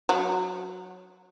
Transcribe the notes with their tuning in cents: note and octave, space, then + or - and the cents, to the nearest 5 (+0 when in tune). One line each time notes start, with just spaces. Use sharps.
F#3 -10